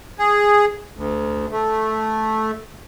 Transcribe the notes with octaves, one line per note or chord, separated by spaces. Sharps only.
G#4
D2
A3